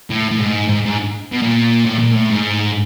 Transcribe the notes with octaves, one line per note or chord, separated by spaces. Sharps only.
A2
A2
G#2
G#2
G#2
B2
A#2
A2
A#2
A2
G#2